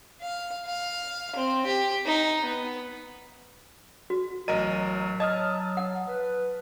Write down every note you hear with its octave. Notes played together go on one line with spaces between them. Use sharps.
F5
F5
C4
G4
D#4
B3
F#4
A1 F#3 A#4 D#5 D#7
D#5 A5 D#6 F6
F#5
B4